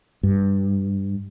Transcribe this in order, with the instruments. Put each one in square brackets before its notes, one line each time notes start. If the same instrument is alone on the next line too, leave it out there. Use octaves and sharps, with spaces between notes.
[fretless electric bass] G2